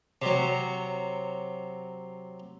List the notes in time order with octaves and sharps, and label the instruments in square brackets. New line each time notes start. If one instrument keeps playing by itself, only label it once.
[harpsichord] C3 F#3